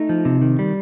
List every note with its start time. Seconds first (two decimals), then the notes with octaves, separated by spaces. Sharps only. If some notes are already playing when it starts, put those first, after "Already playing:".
Already playing: A3 D#4
0.09 F3
0.25 C3
0.42 D#3
0.59 G3